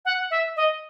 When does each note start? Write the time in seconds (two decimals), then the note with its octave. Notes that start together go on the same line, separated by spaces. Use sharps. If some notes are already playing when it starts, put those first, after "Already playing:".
0.05 F#5
0.31 E5
0.56 D#5